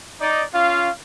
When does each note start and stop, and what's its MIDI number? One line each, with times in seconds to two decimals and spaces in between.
0.21 0.43 63
0.21 0.43 74
0.54 0.90 61
0.54 0.90 65
0.54 0.90 77